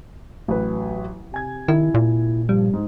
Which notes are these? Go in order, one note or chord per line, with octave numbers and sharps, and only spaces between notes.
A1 F#3 B4
C3 G#5 G#6
D#3 E4
A#2
G2 F3 G3
G#2